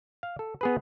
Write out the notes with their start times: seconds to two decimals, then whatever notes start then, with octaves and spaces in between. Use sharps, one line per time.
0.23 F5
0.39 A4
0.61 B3 G#4 B4